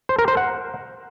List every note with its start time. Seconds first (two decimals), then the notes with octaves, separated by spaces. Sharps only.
0.09 C5
0.19 A#4
0.28 C5
0.37 F#5